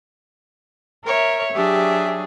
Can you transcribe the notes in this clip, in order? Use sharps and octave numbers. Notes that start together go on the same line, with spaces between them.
A#4 C#5 E5
F#3 D4 G4 G#4 E5